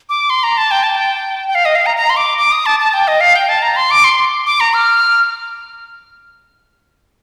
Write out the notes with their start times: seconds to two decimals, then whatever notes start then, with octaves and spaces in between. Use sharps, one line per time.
0.09 D6
0.30 C6
0.43 A#5
0.58 A5
0.71 G5
0.83 A5
0.95 G5
1.48 G5
1.55 F5
1.65 D#5
1.75 F5
1.86 A#5
1.97 A#5
2.10 C6
2.17 D6
2.38 D6
2.52 D#6
2.66 A5
2.80 A5
2.94 G5
3.08 D#5
3.21 F5
3.36 G5
3.49 A5
3.62 A#5
3.76 C6
3.91 D6
4.04 C6
4.46 D6
4.60 A#5
4.73 F6